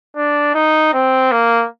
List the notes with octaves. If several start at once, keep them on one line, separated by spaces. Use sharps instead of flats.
D4
D#4
C4
A#3